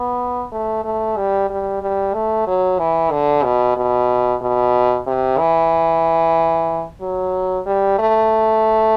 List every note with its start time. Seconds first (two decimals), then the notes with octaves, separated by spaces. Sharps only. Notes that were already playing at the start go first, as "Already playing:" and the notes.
Already playing: B3
0.52 A3
0.84 A3
1.17 G3
1.50 G3
1.82 G3
2.14 A3
2.47 F#3
2.79 E3
3.11 D3
3.44 B2
3.77 B2
4.42 B2
5.07 C3
5.39 E3
7.01 F#3
7.66 G3
7.99 A3